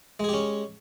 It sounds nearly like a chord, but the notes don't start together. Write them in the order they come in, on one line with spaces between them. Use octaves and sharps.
G#3 G#4 G4 C#4